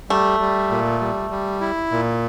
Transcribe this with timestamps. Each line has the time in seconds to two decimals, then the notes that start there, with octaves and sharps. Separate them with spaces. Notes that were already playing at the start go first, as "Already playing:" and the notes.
0.10 G3 A3
0.40 G3
0.70 A#2
1.01 G3
1.31 G3
1.61 E4
1.91 A#2